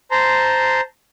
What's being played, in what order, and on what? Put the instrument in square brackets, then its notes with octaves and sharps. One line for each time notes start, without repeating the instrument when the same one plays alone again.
[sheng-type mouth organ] C5 A5 A#5 C6